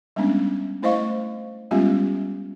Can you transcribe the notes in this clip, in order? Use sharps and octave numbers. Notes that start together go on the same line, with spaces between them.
G3 G#3 B3 C#4 D4
A3 E4 C5 D#5 F5 C#6
G3 G#3 B3 C#4 F4 G4